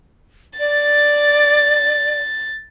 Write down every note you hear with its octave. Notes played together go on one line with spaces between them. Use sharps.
D5 A6